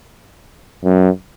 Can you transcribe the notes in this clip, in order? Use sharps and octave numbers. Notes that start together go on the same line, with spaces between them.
F#2